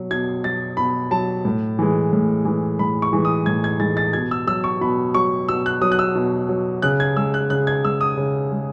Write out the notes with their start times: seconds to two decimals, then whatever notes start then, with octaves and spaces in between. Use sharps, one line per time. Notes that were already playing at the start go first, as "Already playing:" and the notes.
Already playing: B2 F#3
0.11 B2 G#6
0.44 F#3 A6
0.77 B2 B5
1.11 F#3 A5
1.45 A2
1.79 E3 G#3
2.13 A2
2.45 E3 G#3
2.79 A2 B5
3.02 C#6
3.13 E3 G#3
3.25 D#6
3.46 A2 G#6
3.64 G#6
3.80 E3 G#3 A6
3.97 A6
4.13 B2 G#6
4.31 E6
4.47 F#3 E6
4.64 C#6
4.81 B2 B5
5.14 F#3 C#6
5.49 B2 E6
5.66 F#6
5.82 F#3 D#6
5.92 F#6
5.99 E6
6.15 B2
6.49 F#3
6.82 C#3 F#6
7.00 G#6
7.17 G#3 E6
7.34 F#6
7.50 C#3 F#6
7.67 G#6
7.85 G#3 E6
8.01 D#6
8.17 C#3
8.52 G#3